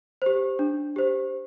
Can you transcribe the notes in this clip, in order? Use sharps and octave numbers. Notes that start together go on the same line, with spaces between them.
G4 C5
D4
G4 C5